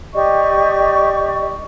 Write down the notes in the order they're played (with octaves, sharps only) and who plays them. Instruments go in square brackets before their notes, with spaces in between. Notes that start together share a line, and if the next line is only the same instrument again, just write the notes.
[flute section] G4 D5 D#5 C#6